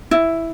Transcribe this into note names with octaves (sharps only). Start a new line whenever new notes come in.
E4